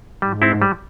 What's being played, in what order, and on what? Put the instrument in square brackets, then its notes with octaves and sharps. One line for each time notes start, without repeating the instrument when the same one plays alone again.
[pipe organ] G#2 [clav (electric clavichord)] G3
[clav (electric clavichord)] C4 E4
G3